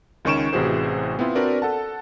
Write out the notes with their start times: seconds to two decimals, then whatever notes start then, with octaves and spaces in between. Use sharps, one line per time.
0.25 C#2 D#3 C#4 C#6 D7 E7
0.53 A1 C3 E3 F#4 G#4 C5
1.19 B3 C4 E4 F4
1.35 C4 D4 F#4 A#4 B4 D5
1.62 A4 F#5 A5